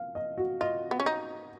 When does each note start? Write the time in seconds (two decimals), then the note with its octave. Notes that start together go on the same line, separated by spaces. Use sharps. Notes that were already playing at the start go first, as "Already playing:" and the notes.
Already playing: F5
0.15 D#5
0.38 F#4
0.61 F4 D#5
0.91 B3
1.00 C#4
1.06 D#4